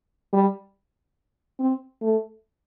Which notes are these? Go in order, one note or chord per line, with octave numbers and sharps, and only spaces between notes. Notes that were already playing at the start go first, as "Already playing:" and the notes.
G3
C4
A3